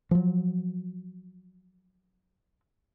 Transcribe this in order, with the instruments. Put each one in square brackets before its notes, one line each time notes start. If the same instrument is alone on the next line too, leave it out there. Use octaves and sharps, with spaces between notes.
[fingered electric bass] F3 F#3